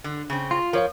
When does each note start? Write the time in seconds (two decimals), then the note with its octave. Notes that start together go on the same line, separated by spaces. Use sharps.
0.04 D3
0.30 C#3 C4
0.51 F4 C6
0.73 F3 A#4 C#5 F5